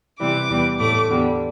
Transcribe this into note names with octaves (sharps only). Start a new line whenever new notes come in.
C3 E3 G3 D6
E2 E3 G3
A2 A3 D6
E2 D3 G3